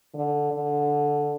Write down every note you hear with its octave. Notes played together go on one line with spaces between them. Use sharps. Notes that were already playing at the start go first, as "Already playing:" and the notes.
D3
D3